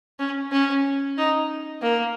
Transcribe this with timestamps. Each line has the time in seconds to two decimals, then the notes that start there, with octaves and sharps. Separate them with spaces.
0.19 C#4
0.52 C#4
1.18 D#4
1.82 A#3